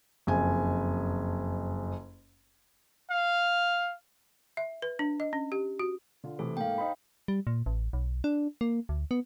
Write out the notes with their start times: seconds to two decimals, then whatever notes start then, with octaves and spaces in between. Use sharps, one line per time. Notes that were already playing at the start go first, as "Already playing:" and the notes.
0.27 F#1 F2 G#5
3.10 F5
4.57 E5
4.82 B4
4.99 D4
5.20 D#5
5.33 C#4
5.52 G4
5.80 F#4
6.24 D3 F4
6.39 C3 E3 A3 A4
6.57 G#2 A#3 F5 G5
6.78 D#4 C5 B5
7.28 G3
7.47 A#2
7.66 A1
7.93 B1
8.24 D4
8.61 A#3
8.89 D2
9.11 B3